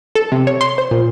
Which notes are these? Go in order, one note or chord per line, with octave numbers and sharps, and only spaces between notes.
A4
C3
C#5
C6
C5
A#2